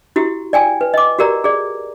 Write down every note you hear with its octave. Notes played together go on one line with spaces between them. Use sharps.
E4 F#4 G4
D5 G5 G#5
B4
D#5 D6
F#4 G4 A#4 D5 A#5
G#4 D5